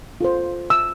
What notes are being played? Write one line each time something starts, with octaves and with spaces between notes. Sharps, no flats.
F4 A4 C5
E6